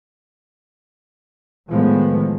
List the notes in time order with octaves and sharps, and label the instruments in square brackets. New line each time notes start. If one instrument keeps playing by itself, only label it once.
[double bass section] A2 D#3 F3 G#3 B3